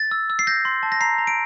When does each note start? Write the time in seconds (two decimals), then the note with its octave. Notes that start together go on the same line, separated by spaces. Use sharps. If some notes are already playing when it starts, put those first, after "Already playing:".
Already playing: A6
0.11 E6
0.30 E6
0.39 C7
0.47 G6 A#6
0.65 C6
0.83 A5
0.92 A#6
1.01 A#5 C7
1.18 A#5
1.27 D7